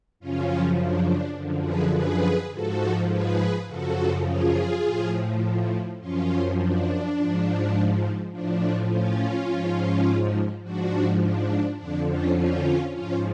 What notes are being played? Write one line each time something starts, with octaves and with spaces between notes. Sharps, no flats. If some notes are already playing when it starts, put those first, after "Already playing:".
F#2 C#3 F3 C#4 F4
D4
D4
F#2 D3 F3
G#4 B4
G#4 B4
G#2 F3 F#4 A4
G#4 B4
F#2 C#3 F3 F#4 A4
F4 G#4
A2 F3
F#2 F3 C#4 F4
D4
G#2 F3
A2 F3 D4
C#4 F4
G#2 F3
G#2 F3 D4 F#4
D4
F2 D3 F3 D4
C#4 F4
C#4 F4
G#2 F3 C#4 F4